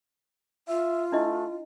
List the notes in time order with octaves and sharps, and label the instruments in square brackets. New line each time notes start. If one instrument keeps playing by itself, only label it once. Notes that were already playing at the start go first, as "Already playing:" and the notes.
[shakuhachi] F4 [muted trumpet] E5
[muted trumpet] A3 [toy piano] D4 E4 D#5